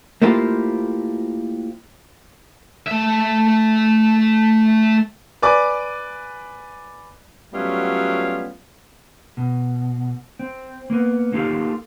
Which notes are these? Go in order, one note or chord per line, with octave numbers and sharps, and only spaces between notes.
A3 A#3 C4 E4 F4 G4
A3 E5
B4 D5 G#5 D6
F#3 G3 A3 B3 C#4 F4
B2
C4
A#3 B3
A#3 D#4 F4 G4 A4